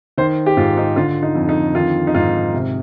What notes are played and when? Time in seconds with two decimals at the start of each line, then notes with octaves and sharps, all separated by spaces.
0.18 D#3 C5
0.46 G4
0.57 G#2 F4
0.77 D#4
0.96 D3 F4
1.23 D#4
1.35 F2
1.49 D#4
1.74 D#3 F4
2.07 D#4
2.15 G#2 F4
2.53 C3